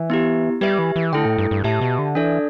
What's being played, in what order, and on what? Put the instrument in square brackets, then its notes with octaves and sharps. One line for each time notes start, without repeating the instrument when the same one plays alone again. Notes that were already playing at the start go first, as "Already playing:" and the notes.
Already playing: [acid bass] E3
[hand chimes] B3 E4 G4
[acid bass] G3 [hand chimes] G4 B4 E5
[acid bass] E3
E3
[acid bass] D3 [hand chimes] A3 E4 A4 G5
[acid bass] A2
G2
G2
[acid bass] A2 [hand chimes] G4 E5 A5
[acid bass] B2
D3
[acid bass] E3 [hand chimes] D4 A4 D5